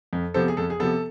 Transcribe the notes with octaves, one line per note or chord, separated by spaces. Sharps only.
F2
C3 F3 B3 A4 C5
G#4
F2 A4
G#4
C3 F3 B3 A4